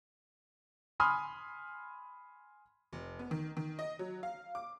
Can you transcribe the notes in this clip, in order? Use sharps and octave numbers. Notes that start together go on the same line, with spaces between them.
G#5 B5 C6 D#6 F6
F1
B3
D#3
D#3
D#5
F#3
F5
D6